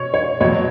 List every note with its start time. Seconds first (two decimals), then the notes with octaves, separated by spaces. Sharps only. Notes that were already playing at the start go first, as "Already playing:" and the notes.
Already playing: B2 C#5
0.14 C#5
0.41 B2 F#3 C#5